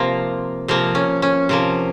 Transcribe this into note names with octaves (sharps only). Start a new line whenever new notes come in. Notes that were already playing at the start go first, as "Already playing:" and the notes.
Already playing: C3 F3 A#3 F4
C3 F3 A#3
C#4
C#4
C3 F3 A#3